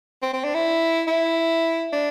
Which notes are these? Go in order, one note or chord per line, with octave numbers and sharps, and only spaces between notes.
C4
C4
D4
E4
E4
D4